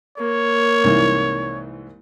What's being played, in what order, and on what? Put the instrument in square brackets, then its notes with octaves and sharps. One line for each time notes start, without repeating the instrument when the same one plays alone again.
[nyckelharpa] A#3 [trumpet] C#5
[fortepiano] C2 G#2 E3